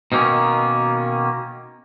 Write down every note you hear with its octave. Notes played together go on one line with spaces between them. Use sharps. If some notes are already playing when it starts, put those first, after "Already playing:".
B2 D#3 A#3 C#4